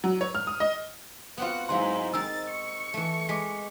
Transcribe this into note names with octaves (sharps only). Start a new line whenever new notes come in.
F#3
C#5
F6
D#6
D#5
B3 C4 F4 F#4 F#5
G#2 F#3 G#3 E4 F5 F#5 C6
C4 D#4 A#4 E6 A6
C#6
E3 A3
G#3 D#5 D6 B6